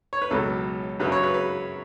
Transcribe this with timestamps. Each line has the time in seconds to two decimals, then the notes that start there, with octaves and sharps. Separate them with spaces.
0.13 C#5
0.22 B4
0.31 C#2 B2 F#3 A4
1.00 F#2 C#3 F#3 B4
1.12 C#5
1.23 B4
1.34 B4